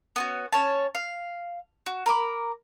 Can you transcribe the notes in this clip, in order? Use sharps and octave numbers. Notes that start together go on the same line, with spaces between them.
B3 C#4 F#4
C#4 C#5 A5
F5
F#4
A#4 B5 D6